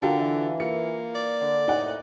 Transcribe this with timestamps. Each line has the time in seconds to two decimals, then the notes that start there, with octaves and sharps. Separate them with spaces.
0.02 D3 F4 F#4 A4 A#4 F5 G5
0.19 E3
0.60 A#3 F4 C#7
1.15 D5
1.41 D3
1.68 A2 C3 D#4 F#5